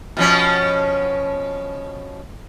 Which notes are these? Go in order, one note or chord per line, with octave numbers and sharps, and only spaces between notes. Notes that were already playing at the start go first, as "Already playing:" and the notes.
B2 F3 C#4